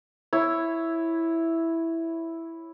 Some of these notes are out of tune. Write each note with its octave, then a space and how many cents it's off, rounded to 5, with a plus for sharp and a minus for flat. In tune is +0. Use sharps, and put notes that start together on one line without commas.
E4 +0 C#5 -5